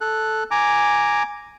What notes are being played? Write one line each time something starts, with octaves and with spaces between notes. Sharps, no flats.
A4 F#6
G#5 A#5 D6